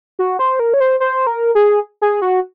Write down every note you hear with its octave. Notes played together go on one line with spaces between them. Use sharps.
F#4
C5
A#4
C#5
C5
C5
A#4
G#4
G#4
F#4